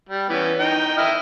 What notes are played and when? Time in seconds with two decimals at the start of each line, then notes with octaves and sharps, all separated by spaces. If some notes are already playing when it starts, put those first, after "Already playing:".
0.09 G3
0.29 E3 B3 C#4
0.60 D#4 G5
0.98 E4 D#5 F6